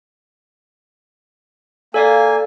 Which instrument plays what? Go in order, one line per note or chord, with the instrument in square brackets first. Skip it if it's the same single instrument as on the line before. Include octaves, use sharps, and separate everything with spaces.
[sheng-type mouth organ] A#3 G#5 [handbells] A4 D5 F5